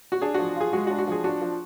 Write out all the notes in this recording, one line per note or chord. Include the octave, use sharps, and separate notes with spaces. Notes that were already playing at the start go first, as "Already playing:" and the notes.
F#4
D4 G#4
F3 F#4
F4 G#4
G#3 F#4
F#4
D4
F#4
F3 G#4
D4 F#4
F3